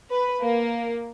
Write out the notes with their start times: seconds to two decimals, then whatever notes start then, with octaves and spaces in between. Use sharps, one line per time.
0.11 B4
0.43 A#3